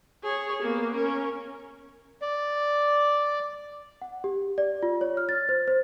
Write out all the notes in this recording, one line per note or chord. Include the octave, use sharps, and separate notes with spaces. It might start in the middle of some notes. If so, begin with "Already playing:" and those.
G#4 C#5
A#3 B3
C#4 A#4
D5
F#5
G4
D5
F4
C#5
F6
A6
C5
C5